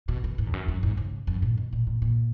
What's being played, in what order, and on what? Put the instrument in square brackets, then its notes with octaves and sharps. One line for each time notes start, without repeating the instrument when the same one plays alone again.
[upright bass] B2
B2
G#2
E2
F#2
F#2
G#2
C#3
F#2
A#2
B2
A#2
A#2
A#2